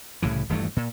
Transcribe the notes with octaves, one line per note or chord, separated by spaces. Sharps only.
C2 A2 C#3 E3
D#1 G2 E3 A3
A#2